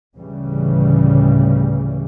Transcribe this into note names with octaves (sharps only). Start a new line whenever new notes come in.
D2 A2 C#3 E3 G3